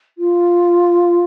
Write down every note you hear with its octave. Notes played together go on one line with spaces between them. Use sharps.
F4